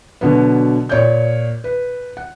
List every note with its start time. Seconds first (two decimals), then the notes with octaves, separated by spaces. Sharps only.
0.21 B2 D3 F#3 B3
0.89 A#2 C#5 D5 G6
1.64 B4
2.17 F#5